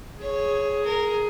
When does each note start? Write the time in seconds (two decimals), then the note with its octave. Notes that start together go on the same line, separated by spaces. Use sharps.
0.21 G#4 C#5
0.84 A#4